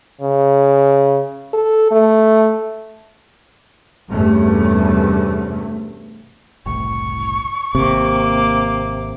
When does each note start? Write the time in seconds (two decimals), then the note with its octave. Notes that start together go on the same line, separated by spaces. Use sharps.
0.21 C#3
1.53 A4
1.91 A3
4.10 E2 G2 C3 A3 C#4
6.66 F#1 C2 A2 C#6
7.75 G#1 C3 A#3 D6